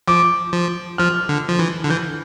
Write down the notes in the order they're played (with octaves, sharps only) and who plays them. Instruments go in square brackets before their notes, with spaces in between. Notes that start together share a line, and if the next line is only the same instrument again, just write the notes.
[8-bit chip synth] F3 [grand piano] D6
[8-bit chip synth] F3
[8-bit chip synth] F3 [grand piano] F6
[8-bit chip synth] D3
F3
E3
D3
[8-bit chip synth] E3 [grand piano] G6